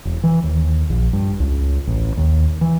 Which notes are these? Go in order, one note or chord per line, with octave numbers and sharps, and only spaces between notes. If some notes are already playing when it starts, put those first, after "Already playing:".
E1
E3
D#2
A#1
G2
C#2
A1
D#2
E3